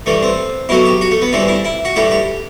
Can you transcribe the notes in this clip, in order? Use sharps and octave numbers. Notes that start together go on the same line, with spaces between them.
G2 E3 A3
C4
B2 F#3 A3 E4
G4
F#4
A3
B3
G2 E3 A3 C4
E4
E4
F#4
G2 E3 A3 G4
G4